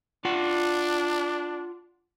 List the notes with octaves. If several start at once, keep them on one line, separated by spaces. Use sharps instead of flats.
D4 F4 F#5